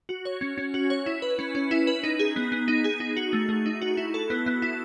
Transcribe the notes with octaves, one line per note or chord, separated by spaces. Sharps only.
F#4
C#5
C#4
C#4
F#4
C#5
E4
B4
C#4
C#4
E4
B4
D#4
G#4
B3
B3
D#4
G#4
D#4
F#4
A3
A3
D#4
F#4
E4
A4
B3
B3
E4